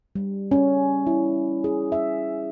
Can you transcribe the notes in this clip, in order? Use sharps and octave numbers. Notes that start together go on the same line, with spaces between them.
G3
C#4
E4
G#4
E5